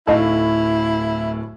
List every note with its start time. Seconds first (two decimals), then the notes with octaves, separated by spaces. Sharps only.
0.07 D1 A2 D#4 E4 A4 F5